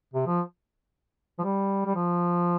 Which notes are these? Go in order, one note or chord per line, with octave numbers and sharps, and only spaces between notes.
C3
F3
F3
G3
G3
F3